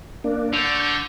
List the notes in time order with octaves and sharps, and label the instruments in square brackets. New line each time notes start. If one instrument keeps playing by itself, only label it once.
[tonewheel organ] A#3 D4
[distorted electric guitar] D3 [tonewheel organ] C#6 G6